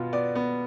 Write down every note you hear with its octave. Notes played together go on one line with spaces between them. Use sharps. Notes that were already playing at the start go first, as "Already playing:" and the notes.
Already playing: B2 B3 F4
B3 D5
B3